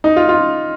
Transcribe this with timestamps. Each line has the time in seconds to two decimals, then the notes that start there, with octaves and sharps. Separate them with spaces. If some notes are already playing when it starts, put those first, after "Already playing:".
0.04 D#4
0.16 F4
0.29 F4